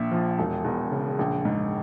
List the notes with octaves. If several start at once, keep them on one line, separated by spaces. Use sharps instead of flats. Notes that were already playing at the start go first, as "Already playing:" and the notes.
Already playing: A#1 A#2 E5
F3
E1
E2
C#3
A#1
G#2